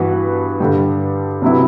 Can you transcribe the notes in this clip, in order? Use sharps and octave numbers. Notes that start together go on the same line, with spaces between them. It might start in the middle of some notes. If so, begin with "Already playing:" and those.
Already playing: G2 E3 B3 F#4 B4
G2 D3 G3
C3 F#3 B3 E4